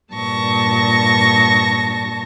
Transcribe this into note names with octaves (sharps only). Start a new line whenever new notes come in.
G2 A#2 A5 C#6 A#6